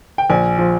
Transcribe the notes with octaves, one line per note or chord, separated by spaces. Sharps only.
G5
A#1 G#5
F3